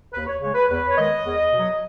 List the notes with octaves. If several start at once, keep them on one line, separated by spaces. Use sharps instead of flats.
D#2 B4
C#5
C#3 G#3 C#5
B4
E2 B4
C#5
D#3 G#3 D#5
E2
B2 F#3